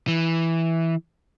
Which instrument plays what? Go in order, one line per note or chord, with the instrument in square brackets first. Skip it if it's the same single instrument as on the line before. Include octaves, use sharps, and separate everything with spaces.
[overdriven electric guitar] E3